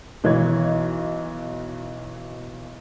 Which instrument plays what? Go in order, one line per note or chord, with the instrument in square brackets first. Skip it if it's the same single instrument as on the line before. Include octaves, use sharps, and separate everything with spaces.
[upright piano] B1 E3 C#5 G#6